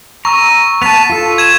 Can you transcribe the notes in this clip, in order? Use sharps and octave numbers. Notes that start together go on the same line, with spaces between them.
A#5 C#6 E6
B3 A5 B6 D#7 F7
F4 A4
G#6 E7